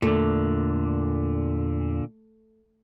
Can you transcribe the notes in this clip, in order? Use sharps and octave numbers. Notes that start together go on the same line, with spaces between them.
E2 A#2 D3 A3